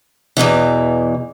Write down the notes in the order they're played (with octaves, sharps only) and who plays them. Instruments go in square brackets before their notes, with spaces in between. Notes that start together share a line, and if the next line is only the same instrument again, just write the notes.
[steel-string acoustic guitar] E2 G#2 B2 E3